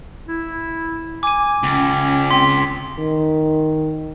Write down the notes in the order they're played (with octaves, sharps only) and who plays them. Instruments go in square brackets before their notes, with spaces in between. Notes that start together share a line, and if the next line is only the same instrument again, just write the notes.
[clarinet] E4
[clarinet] G#5 [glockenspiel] D6 D#7
[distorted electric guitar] C#2 [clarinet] C#4
[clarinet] C4 [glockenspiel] C6 B6
[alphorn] D#3